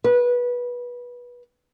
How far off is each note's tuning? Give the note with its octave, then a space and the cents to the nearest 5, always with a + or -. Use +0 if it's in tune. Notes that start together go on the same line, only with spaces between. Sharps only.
B4 -20